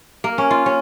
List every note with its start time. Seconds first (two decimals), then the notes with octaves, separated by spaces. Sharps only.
0.24 A#3
0.38 C#4
0.51 F4
0.66 C#4